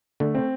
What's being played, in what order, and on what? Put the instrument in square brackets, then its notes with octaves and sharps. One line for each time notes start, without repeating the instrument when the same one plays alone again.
[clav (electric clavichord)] D3 [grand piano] A3
[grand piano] C4